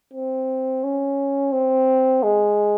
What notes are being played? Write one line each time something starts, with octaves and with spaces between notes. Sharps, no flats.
C4
C#4
C4
G#3